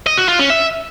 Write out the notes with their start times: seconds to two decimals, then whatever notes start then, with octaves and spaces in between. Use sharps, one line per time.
0.07 D#5
0.17 F#4
0.28 F4
0.39 C#4
0.50 E5